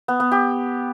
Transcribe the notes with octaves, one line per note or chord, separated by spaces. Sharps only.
B3
B3
G4